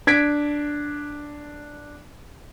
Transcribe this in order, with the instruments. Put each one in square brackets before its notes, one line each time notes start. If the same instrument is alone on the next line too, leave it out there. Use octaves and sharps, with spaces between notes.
[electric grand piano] D4 G#6 B6 D7